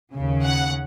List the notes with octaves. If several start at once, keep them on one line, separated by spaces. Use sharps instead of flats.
D#2 C#3
F#5